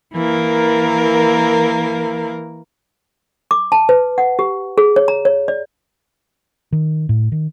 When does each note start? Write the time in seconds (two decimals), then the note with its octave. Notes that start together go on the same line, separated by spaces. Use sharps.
0.14 E3 A#3 A#4
3.51 D6
3.72 A5
3.89 B4
4.18 F#5
4.39 G4
4.78 G#4
4.96 C#5
5.08 A#5
5.25 C#5
5.48 D5
6.72 D#3
7.09 A2
7.32 D#3